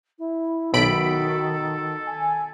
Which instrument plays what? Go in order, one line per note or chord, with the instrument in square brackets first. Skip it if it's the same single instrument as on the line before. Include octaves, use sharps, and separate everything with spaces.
[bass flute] E4
[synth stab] B1 B5 D7 [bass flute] D#3 [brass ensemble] F#4 [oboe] A4
[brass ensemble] G#5